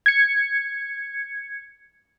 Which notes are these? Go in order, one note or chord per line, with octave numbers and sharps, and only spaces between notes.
G#6 C#7